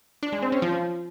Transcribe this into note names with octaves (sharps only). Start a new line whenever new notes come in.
D4
G#3
C4
C#4
F3